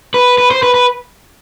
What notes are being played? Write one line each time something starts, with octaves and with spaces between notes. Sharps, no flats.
B4
B4
C5
B4
B4